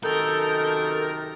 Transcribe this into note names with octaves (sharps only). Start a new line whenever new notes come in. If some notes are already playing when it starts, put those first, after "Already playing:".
F#2 C3 D#3 A4 A#4 G6